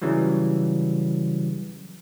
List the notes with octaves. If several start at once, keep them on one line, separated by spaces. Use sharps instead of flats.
C#3 E3 F#3 G3